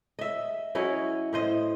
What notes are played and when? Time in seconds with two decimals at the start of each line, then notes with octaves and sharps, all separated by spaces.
0.19 D#5 E5
0.75 F#3 C#4 E4 D#5
1.33 A2 C5 D#5